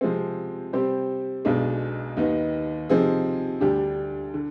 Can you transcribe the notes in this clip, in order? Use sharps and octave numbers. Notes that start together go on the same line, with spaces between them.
C3 F3 G#3 C4
C3 G3 C4 G4 C5
B1 B2 G#3 D4
D#2 D#3 B3 D#4
C3 F3 C4 D#4 G#4
D2 D3 G3 D4 G4
D3